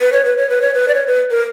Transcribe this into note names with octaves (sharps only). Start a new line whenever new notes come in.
B4
C#5
B4
C#5
B4
C#5
B4
D5
C#5
B4
A#4